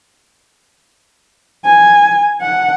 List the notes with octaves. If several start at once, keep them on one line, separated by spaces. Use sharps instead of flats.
G#5
F#5